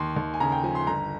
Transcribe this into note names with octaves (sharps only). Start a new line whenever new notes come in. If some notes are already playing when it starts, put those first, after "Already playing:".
Already playing: D#2 C6
D#2
G#5
C#3 A#5
G5
F3 G#5
C6
G1 A#5